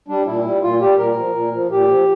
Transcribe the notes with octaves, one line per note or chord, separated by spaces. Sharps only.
G3 D4
A#2 E4
G3
A#2 F4
G3 G4
A#2 A#4
F3
A#2
F3
A#2 G4
F3